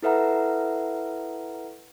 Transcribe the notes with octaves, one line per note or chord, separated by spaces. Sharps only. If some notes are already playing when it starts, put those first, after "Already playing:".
E4 A4 B4 E5 F#5 A#5